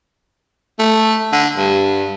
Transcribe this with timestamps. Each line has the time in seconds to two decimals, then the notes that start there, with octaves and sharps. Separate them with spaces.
0.79 A3
1.33 D3
1.57 G2